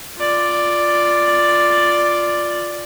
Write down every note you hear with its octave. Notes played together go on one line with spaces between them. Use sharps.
F4 D5